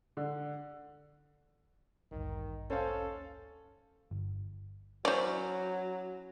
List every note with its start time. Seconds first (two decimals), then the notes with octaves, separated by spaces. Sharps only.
0.17 D3
2.12 A1 D2 G2 D#3
2.70 C#4 A4 C5 F5
4.11 G1
5.05 F#3 C#4 E4 C5 D5